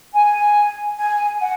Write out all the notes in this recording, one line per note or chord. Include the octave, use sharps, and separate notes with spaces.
G#5
G#5
F#5